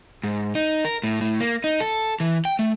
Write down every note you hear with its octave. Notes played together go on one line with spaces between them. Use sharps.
G#2
D#4
A#4
A2
A2
A#3
D#4
A4
E3
G5
A3